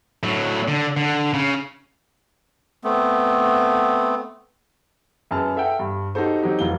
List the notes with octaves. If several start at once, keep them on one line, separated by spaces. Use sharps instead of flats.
A2 F#3
D3
D3
C#3
A3 B3 C4
F#2 G#4 B4 A5 F6
A4 E5 F#5 G5
G2
D#4 F#4 G4 A4 C5
F#3 C4 D#4 G4
F1 E3 F#3 F5 G7